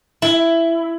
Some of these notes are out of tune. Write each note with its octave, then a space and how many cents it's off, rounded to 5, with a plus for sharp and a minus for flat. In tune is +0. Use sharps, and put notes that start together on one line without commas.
E4 +10